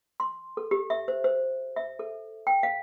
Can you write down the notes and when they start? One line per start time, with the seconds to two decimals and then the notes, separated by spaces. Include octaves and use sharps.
0.20 C6
0.57 A4
0.71 G4
0.90 E5
1.08 C5
1.24 C5
1.76 E5
1.99 A4
2.47 G5
2.63 F5